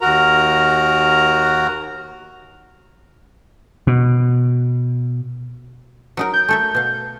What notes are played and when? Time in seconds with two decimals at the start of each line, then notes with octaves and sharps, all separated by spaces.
0.01 D#2 F#4 A#4 A#5
3.87 B2
6.17 F#3 D#4 A#4
6.34 G6
6.48 A3 A4 E5
6.75 B2 F5